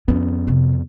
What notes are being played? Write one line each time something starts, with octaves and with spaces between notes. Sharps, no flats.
F2 B3 C#4
C3 D#3